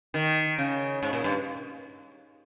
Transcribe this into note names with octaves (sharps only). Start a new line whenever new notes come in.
D#3
C#3
G#2
A#2
G2